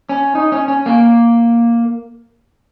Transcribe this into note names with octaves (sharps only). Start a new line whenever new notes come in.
C#4
D#4
C#4
C#4
A#3